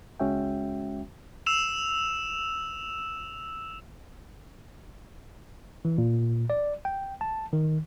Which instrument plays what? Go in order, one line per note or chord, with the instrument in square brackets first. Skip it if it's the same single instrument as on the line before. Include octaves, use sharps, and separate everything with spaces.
[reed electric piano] C#2 G#3 C#4 F#4 E5 G5
[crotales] E6 E7 F7
[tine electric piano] E3
A#2
D5
G5
A5
D#3